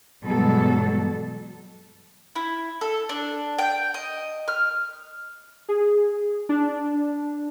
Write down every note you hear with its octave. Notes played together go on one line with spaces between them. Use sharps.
G2 B2 E3 F#3 G#3 A4
E4
A4
D4
G5
D#5
F6
G#4
D4